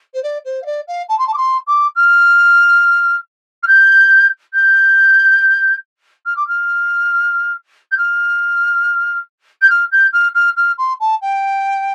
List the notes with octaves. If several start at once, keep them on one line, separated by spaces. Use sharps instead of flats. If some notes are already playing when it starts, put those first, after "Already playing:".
C5
D5
C5
F5
D5
F5
A5
C6
A5
D6
C6
D6
F6
F6
G6
G6
F6
D6
F6
G6
F6
G6
F6
G6
F6
F6
F6
C6
A5
G5